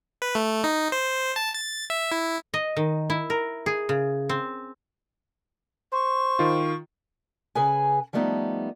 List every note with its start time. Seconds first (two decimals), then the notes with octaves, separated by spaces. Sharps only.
0.22 B4
0.35 A3
0.64 D#4
0.92 C5
1.36 A5
1.54 A6
1.90 E5
2.12 E4
2.54 D#5
2.77 D#3
3.10 E4
3.30 A#4
3.66 G#4
3.89 C#3
4.29 C4
5.93 C5 C#6
6.39 D#3 F4
7.55 C#3 G#4 B4 G#5
8.13 F3 G3 A3 B3 D4 D#4